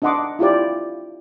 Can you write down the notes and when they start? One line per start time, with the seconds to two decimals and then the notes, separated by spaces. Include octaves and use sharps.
0.02 D4 D#4 D#5 F#5 C6 D6
0.39 E4 F4 G4 D5